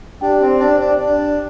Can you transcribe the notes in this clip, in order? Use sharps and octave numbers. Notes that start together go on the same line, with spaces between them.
D4 G4 D5 G5
C4
D4
D4
D4